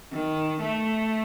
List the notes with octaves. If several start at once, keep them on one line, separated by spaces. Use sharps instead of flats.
D#3
A3